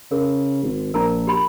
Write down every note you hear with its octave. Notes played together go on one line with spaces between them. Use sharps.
C#3 A#4
G#1
A#1 A#4 A5 A#5
G4 B5 C6